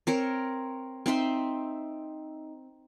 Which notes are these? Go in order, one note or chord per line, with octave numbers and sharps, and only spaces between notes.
C4 A#4 C#5
C4 D#4 E5 C6